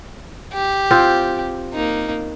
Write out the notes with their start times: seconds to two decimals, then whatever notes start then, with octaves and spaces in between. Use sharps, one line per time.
0.53 G4
0.91 C4 F4
1.74 A#3 D#4